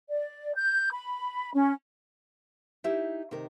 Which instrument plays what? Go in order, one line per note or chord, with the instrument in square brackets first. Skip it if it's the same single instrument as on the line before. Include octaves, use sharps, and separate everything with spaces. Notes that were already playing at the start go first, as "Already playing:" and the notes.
[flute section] D5
G6
B5
C#4
[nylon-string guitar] D#4 E4 G4 E5
C3 D#3 A#4